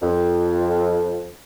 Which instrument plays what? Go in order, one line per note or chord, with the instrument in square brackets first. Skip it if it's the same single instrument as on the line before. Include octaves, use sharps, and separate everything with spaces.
[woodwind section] F2